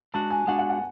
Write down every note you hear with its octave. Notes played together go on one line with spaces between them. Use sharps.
G#3 D4 F#4 A5
G#5
G#3 D4 F#4 F#5
F#5
F#5